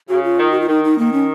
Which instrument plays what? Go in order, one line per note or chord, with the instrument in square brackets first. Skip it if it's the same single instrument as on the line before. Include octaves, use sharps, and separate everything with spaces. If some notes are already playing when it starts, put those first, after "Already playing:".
[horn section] C#3 [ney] F#4
[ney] F4
[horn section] D#3
[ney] F#4
F4
[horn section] D#3 [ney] D#4
[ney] D#4
[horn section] D#3 [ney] A#3
[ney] C#4